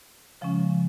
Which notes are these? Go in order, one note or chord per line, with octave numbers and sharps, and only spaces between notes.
C#3 F3 G#3 C#4